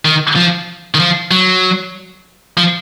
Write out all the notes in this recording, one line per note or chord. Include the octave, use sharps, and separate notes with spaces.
D#3
F3
D#3
F3
F#3
F3